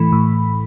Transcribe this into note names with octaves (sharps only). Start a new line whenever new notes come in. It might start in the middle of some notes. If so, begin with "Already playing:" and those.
Already playing: A2 E3 A3 B5
A2